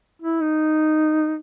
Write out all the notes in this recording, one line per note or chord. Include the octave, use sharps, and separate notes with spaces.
E4
D#4